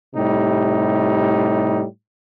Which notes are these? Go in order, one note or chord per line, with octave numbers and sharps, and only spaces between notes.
A2 C3 G3 D#4